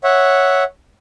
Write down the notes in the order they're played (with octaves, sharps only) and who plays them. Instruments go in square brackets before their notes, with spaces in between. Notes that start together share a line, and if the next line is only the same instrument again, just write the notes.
[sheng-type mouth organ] C#5 E5 F#5